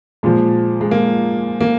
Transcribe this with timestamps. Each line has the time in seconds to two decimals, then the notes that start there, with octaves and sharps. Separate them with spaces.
0.23 A#2 F3 G#3
0.81 G#3
0.91 A#3
1.61 A#3